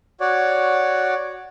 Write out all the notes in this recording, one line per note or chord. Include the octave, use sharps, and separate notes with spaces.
F#4 C#5 D5